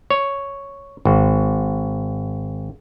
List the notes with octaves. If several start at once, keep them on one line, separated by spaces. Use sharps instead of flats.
C#5
G#1